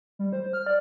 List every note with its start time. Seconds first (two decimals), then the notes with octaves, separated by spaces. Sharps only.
0.19 G3
0.33 C5
0.53 F6
0.66 D5